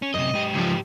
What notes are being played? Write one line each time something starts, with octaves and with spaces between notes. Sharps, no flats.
C#4
F#2 C3 D#5
G#2 G4
C#2 F3